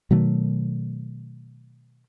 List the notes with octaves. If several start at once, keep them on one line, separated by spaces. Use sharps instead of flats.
B2 D#3 F#3 A3